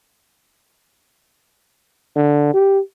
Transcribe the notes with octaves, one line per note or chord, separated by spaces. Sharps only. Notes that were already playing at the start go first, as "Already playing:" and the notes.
D3
G4